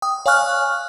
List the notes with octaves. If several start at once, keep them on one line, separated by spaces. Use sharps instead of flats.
G5 D#6
C#5 F5 G#5 C#6 F6 F#6